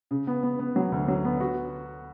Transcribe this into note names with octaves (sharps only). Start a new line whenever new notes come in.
C#3
B3
B3
B3
F#3
D2
F#3
B3
F#4